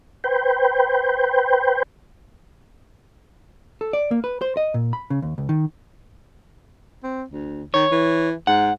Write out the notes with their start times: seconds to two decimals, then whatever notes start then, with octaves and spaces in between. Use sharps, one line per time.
0.24 B4 C5 G5
3.81 A4
3.93 D5
4.11 A#3
4.24 B4
4.41 C5
4.57 D#5
4.74 A#2
4.93 B5
5.10 C#3
5.22 D#2
5.38 C#2
5.49 D#3
7.03 C4
7.28 D2
7.74 D#3 C#5
7.91 E3
8.47 G#2 F#5